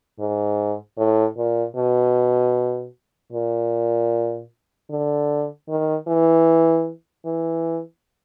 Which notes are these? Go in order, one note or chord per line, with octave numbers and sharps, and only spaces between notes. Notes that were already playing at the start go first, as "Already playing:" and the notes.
G#2
A2
A#2
B2
A#2
D3
D#3
E3
E3